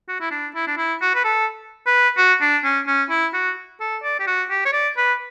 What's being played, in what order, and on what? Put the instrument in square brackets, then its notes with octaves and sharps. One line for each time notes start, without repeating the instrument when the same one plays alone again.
[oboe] F#4
E4
D4
E4
D4
E4
F#4
B4
A4
B4
F#4
D4
C#4
C#4
E4
F#4
A4
D5
G4
F#4
G4
C#5
D5
B4